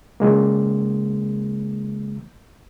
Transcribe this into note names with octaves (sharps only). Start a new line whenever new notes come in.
C#3 G#3 A#3